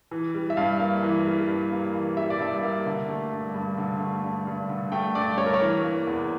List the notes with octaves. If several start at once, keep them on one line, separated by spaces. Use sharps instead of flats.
E3
G3
E5
G2 F5
A#3
E3
G3
G2
A#3
E3
G3 E5
D5
G2 E5
A#3
D3
A3
G2
G2
D3
A3
G2
G2
D3
A3 G5
G2 D5
G2 C#5
A#4
C#5
E3
A#3
E2